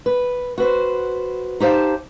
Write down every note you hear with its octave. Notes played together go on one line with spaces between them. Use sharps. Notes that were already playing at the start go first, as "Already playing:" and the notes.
B4
F#4 B4 C5
D#4 G4 C5 F5 A5